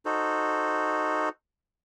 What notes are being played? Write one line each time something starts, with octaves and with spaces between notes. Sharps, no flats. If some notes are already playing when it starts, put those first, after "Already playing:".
D#4 F#4 A4 C5